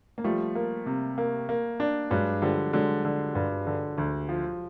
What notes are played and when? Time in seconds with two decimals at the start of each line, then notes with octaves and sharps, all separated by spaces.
0.18 A#3
0.24 F3 G3 A3
0.55 A#3
0.86 C3
1.18 A#3
1.49 A#3
1.80 D4
2.10 G2 F#3 G#3
2.42 D3 F3 G3
2.73 D3 F#3 G#3
3.05 D3
3.35 G2
3.67 D3
3.98 D2
4.29 F3